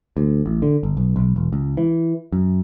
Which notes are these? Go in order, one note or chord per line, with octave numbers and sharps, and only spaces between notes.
D2
A1
D3
G1
B1
B1
E1
C#2
E3
F#2